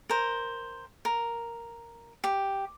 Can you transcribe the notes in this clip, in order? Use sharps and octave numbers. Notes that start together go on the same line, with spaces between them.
A#4 C5
A#4
G4